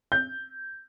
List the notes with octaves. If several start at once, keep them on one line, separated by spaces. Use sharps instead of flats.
G6